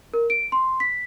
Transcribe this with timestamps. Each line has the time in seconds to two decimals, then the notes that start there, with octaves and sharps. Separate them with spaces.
0.14 A#4
0.30 D7
0.52 C6
0.80 B6